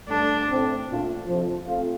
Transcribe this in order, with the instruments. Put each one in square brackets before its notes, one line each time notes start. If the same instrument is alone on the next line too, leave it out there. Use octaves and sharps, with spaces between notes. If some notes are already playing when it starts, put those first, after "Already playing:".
[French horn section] G2 D3 A3 [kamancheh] D4
[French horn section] A2 A3 C4
A#2 A3 D4 F4
F2 C3 F3
A3 C4 F4